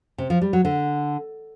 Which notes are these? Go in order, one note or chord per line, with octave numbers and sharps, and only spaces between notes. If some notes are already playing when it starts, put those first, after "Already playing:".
C3
F3
G3
F#3
D3